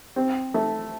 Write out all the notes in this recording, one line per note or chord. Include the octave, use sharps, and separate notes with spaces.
C4
A3